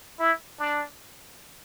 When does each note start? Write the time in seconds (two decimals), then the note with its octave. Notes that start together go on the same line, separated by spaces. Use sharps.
0.20 E4
0.59 D4